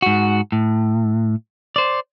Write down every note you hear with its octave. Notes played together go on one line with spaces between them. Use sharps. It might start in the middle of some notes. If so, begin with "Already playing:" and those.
G#2 F#4
A2
C5 D5